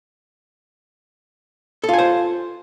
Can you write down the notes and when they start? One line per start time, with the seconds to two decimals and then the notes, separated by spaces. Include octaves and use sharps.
1.84 A4
1.89 F4
1.94 G#5
1.98 C5